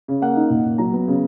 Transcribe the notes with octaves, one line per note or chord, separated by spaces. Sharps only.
C#3
A#3 F#5
D#4
A#2
A#2
F#3 A#5
B3
C#3